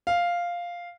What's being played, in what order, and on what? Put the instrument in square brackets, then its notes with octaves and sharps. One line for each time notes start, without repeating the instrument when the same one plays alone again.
[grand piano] F5